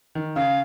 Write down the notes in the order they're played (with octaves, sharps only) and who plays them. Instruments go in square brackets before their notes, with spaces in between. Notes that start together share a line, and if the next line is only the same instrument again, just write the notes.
[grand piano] D#3
[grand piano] C#3 [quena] F5